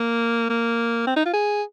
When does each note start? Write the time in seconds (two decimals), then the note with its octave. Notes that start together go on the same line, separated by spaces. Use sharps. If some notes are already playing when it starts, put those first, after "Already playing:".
Already playing: A#3
0.50 A#3
1.07 C4
1.16 D#4
1.25 F4
1.33 G#4